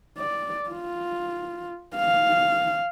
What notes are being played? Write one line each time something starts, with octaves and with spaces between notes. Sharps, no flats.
D5
F4
F5